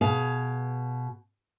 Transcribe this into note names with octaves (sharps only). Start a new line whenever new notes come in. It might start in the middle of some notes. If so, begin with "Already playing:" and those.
B2 G#4 F5